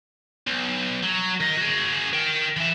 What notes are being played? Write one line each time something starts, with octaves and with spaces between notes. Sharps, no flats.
B1
F#3
D#3 D#5
F#4 G#4
A#4 G5
E3 E4